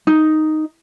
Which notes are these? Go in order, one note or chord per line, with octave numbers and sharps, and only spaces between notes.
D#4